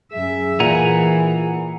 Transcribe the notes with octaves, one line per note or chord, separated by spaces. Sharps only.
F#2 G#4 E5
A#2 E3 F#5 G#5 A#5